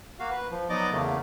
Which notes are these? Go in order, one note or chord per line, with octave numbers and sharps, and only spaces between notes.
A#3 F#4 F5
B4
F3
F#3 B3 D#4 D5 D#5 D6
E2 C#3 A3 A#3